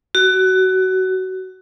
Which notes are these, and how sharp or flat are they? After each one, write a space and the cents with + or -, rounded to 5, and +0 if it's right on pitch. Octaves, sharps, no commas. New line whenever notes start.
F#4 +20